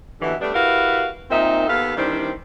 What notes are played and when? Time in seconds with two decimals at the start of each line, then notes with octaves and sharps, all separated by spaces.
0.21 D#2 B2 D3 E3
0.41 G3 A3 B3 D4
0.54 E4 F#4 G4 A#4 B4 F5
1.30 A#2 D#3 C4 D#4 E5
1.68 D#2 B3 A4 F5
1.97 D#3 E3 G3 C4 D4 C5